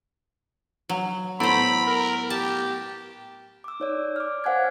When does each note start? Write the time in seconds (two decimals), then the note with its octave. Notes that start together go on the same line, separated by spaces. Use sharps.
0.89 F#3
1.40 A2 B3 C5 A#5 B5 D7
1.87 A#4
2.30 G4 A5
3.64 D6 E6
3.80 D#4 C#5 D5
4.16 D6 F6
4.44 C5 F5 F#5 G#5 F#6 G#6